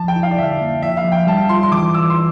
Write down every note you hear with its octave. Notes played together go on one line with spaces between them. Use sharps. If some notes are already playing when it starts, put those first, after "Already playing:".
Already playing: F3 A5
G5
E4
F5
D5
D3 E5
A#3
F3 E5
F5
F3
G5
G3 A5
F4 C6
C6
E3 D6
E3 E6
C6